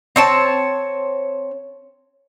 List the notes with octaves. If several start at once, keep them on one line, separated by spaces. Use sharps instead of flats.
C4 C#5 A5